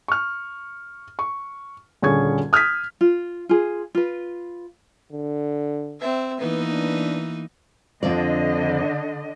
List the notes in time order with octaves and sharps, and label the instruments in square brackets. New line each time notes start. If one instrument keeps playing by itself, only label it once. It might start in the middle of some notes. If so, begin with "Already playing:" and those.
[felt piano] C#6 F6
C#6
D#1 D3 C#4 G#4 C#6 G#6
D#6 F6 G6 G#6 B6
[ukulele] F4
F4 G#4
F4 B4
[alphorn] D3
[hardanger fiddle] C4 E5
[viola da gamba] E3 A#3 D#4 [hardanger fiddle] B3 [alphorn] B4
[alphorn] D4
[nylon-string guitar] F2 C4 D5 [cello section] D3 D#5